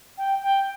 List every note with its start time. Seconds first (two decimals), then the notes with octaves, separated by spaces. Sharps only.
0.18 G5
0.42 G5